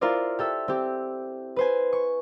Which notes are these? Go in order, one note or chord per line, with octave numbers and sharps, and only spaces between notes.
E4 F4 A#4 C5 D5
G4 A4 E5
C4 G4
B4 C5 G#5
C#6